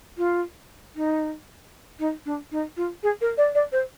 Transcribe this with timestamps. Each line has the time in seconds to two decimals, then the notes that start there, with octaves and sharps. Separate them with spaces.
0.17 F4
0.96 D#4
1.99 D#4
2.26 D4
2.52 D#4
2.77 F4
3.03 G#4
3.21 A#4
3.37 D5
3.55 D5
3.72 C5